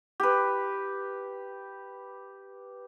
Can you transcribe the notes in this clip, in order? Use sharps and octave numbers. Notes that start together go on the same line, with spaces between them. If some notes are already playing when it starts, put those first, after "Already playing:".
G4 B4